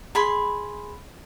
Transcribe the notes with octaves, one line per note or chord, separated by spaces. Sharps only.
G#4 B5 C6